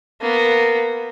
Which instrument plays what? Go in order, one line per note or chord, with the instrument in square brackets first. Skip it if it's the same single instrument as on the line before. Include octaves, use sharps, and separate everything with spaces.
[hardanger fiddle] A#3 B3